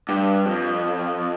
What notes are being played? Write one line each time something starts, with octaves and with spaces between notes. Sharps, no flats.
G2
F2